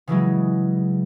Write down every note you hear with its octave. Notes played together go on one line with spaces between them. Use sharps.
C#3 E3 F#3 G#3